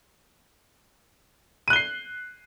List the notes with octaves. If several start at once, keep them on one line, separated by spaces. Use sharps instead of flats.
F#6 C7 D#7 G7